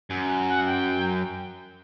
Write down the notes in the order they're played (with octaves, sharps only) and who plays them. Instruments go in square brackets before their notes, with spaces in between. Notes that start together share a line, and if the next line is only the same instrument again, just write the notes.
[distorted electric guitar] F#2
[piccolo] F#5
G5